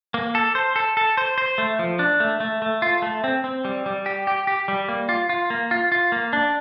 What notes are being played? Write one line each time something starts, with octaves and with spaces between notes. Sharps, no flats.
A#3
A4
C5
A4
A4
C5
C5
A3
F3
D4
A3
A3
A3
F4
A3
C4
C4
G3
G3
G4
G4
G4
G3
A#3
F4
F4
A#3
F4
F4
A#3
D4